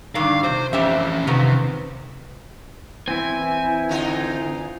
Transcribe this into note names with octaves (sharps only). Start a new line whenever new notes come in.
G2 D3 D#3 F5
C3 C5
F2 E3 C#4 G4 E5
F2 C3 D#3 B3
E3 C4 E4 G#5
D3 D#4 F4